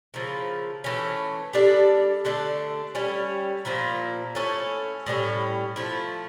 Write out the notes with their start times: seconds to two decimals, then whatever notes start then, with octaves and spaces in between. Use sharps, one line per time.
0.14 C#3 F3 A#3 E4
0.84 E3 A3 C#4
1.53 G3 D4 A4 D5
2.25 D3 A3 D4 A4
2.95 G3 C#4 E4
3.65 A#2 F3 A#3 E4
4.35 A3 C#4 E4 A4
5.06 A2 G3 C#4 E4
5.76 F3 A3 E4